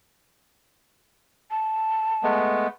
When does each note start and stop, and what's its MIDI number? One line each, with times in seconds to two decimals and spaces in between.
1.51 2.40 81
2.23 2.67 56
2.23 2.67 57
2.23 2.67 59